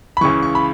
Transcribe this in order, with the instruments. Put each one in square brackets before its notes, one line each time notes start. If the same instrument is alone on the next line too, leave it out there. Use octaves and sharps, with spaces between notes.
[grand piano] B5
C#2 C#3 E3 C#6
C#6
B5